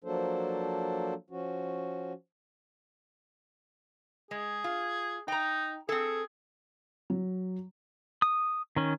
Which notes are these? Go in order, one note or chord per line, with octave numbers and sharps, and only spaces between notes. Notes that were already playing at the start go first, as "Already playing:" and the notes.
F3 F#3 A#3 D4 A4 C5
F3 C#4 F#4
G#3 G#4
F4
D#4 G5 A#5
C4 G#4 A4
F#3
D#6
D#3 C#4